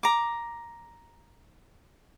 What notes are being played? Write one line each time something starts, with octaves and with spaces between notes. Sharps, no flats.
A#5 D6